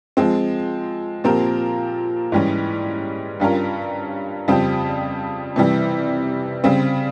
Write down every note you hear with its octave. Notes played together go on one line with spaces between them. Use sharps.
F3 G#3 C4
A#2 F3 C4 G4 A#4
G#2 E3 G3 C#4
G2 G3 C#4 F4 A#4
F2 C#3 G3 C4 G4
C3 E3 G3
C#3 G3 C4